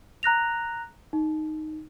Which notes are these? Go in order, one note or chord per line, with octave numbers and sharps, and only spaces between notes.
A#5 F#6 A#6 F7
D#4